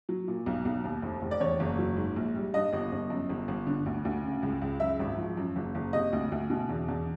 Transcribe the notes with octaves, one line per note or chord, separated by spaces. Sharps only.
F#3
A#2
B1
B1
D#2
F1
F1
D5
E2 C#5
F#1
F#3
G#2
A#1
G3
G2 D#5
G1
G1
F#2
G1
G1
D3
D2
D2
C#3
C#2
C#2
F#2 E5
G#1
F3
F#2
F#1
F#1
C3 D#5
D2
D2
B2
E2
E2